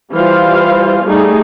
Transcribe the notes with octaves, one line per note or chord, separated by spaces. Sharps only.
E3 G3 F4 C5 F5
G3 A3 D#4 G#4